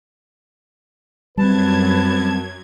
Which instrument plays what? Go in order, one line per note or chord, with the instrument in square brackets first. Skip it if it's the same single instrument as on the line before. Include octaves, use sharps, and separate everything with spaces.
[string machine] F#2 G#6 [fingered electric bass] G3 C4 [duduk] B4 [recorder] A5